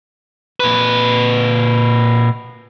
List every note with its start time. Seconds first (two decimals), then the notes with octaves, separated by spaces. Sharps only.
0.60 A#2 B4